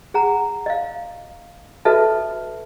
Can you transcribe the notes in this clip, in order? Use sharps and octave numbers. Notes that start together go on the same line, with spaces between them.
G#4 F#5 A#5
D#5 F5
F#4 A4 B4 D#5 E5 A5